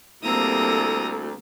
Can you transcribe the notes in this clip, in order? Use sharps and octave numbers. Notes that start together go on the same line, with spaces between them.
D2 G3 A#3 C4 E4 A4 A#5 D#6